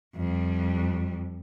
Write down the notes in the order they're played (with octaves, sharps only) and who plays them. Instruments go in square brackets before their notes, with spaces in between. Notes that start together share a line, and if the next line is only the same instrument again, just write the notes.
[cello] F2 G3